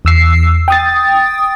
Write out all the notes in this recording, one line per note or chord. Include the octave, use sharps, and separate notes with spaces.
E2 E6 C7
G5 D#6 A6